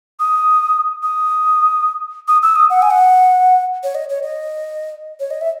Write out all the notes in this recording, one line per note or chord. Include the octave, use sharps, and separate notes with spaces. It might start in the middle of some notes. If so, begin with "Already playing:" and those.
D#6
D#6
D#6
E6
D#6
F#5
G#5
F#5
C#5
D#5
C#5
D#5
C#5
D#5
E5